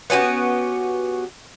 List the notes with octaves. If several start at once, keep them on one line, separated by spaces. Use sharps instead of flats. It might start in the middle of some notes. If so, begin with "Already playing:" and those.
B3 C#4 F#4 G4